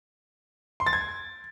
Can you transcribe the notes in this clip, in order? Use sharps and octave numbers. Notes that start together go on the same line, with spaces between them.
C6
A6
G#6